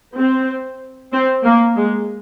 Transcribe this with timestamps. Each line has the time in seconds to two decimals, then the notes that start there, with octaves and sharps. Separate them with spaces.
0.17 C4
1.12 C4
1.44 A#3
1.76 G#3